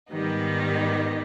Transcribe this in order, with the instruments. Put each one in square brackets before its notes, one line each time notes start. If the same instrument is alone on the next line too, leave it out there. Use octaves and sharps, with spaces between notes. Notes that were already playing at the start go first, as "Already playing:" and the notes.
[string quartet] G#2 D#3 G3 B3 D#4